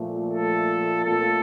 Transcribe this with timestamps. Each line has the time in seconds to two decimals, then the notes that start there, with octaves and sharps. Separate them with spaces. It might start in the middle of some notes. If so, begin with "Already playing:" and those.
Already playing: A#2 F3 A3
0.34 A4
1.04 A#2 A3 C4 F4 A4 A#4